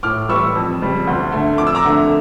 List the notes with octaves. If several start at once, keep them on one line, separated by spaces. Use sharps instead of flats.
A2 D6 F6
E3 G3 C#6 E6
F2
C#3 G3
D2
D3 A3
F2 D6
E6
A#5 D6
D3 A3